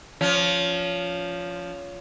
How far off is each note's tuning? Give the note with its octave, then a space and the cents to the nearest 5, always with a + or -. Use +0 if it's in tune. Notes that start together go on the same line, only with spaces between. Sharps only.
F3 +0 C#4 +25